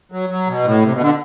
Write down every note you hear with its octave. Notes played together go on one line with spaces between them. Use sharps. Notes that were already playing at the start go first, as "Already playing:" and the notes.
F#3
F#3
B2
A2
C3
B2
D3